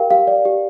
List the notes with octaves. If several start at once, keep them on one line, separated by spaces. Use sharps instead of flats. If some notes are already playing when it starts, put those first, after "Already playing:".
Already playing: G4 A#4 F5 G5
G4 F5
D5
G4